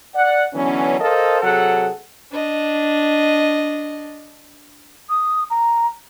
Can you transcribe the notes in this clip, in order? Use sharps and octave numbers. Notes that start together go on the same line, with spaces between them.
D5 F#5
D3 E3 F#3 B3 C#4
A4 A#4 C5 D#5 F5 A5
C3 F#3 G#4 A4 F#5
D4 D#5
D#6
A#5